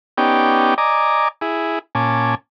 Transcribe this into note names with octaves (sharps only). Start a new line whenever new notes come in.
B3 C#4 D#4 G4 D5 G5
D5 D#5 G#5 A#5 D6
E4 G#4
A#2 C#4 G#5 A5 D6